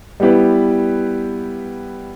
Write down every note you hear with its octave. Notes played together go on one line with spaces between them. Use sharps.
G3 B3 E4 G4 B4